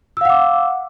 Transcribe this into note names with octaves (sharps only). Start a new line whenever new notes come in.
F5 F#5 D6 E6